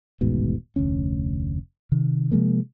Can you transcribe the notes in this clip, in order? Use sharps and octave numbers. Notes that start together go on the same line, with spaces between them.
D#1 A1 G#2 B2
F1 D2 C#4
C3 D#3
C3 F3 G#3 A#3